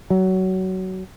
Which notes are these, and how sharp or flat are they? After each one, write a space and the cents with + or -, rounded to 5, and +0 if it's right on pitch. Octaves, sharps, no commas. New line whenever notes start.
F#3 +20